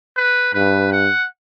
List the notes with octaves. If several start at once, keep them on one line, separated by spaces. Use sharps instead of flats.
B4
G2 B4
F#5